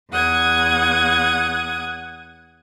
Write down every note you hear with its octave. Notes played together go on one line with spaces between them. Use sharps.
E2 F#5 D#6 G#6